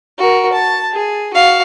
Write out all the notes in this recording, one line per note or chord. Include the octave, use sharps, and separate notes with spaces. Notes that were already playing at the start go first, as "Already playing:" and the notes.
F#4 A#4
A5
G#4
F#4 F5